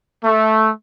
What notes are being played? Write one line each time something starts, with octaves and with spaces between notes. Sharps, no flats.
A3